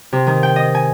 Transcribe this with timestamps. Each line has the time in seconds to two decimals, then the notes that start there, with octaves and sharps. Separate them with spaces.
0.13 C3
0.26 D#3
0.43 G5
0.56 D#5
0.75 G#5